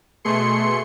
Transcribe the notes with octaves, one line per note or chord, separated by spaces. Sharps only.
B2 A3 G#4 C6 C#7